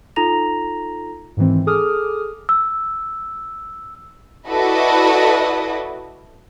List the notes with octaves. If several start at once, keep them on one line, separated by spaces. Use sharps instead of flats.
D#4 F4 A4 A#5 A#6 F7
G#2 D#3 E3 C4
G#4 A4 D6 D#6 F6
E6
E4 F#4 A4 B4 D5 D#5